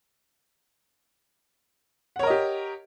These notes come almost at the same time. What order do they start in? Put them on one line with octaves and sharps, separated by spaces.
F#5 C#5 A#4 D#5 G4